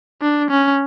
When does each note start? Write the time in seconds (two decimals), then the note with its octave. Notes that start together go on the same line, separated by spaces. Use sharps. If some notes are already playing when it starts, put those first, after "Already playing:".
0.22 D4
0.50 C#4